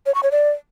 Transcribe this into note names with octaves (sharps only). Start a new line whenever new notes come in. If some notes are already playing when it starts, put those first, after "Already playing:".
C#5
C#6
C#5
D5